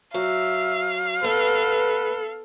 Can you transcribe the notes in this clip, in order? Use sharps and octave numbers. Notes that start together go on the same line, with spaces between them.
F#3 E5 F5
B3 A4 B4